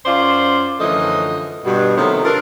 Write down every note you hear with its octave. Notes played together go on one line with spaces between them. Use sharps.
F#2 C#4 F4 C5 D5
F#2 D3 E3 F3 A3 D#5
G2 B2
C3 D#3 F3 F#3 A3 B3
D4 F4 A4 A#4